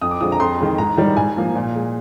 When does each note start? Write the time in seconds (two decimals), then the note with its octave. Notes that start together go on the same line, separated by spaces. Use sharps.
0.02 F2 D#6
0.11 D6
0.21 D3 F3 G#3 D#6
0.32 A#5
0.40 F2 C6
0.60 D#3 G#3
0.78 G#2 A#5
0.97 D#3 G3
1.17 G#2 G#5
1.36 F3 A#3
1.55 A#2
1.75 G#3